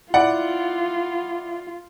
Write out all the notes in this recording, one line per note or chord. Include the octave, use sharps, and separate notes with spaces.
E4 F4 D5 F#5